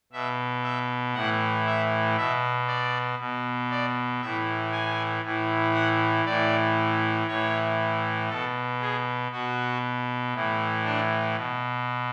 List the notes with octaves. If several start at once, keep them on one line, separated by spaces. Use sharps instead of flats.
B2 E5
E5
A2 E3 F#5
E5
B2 E5
D5
B2
D5
A2 E3 E5
G#5
A2 E3
F#5
A2 E3 D5
A2 E3 C#5
B2 A4
G#4
B2 F#4
A2 E3
D4
B2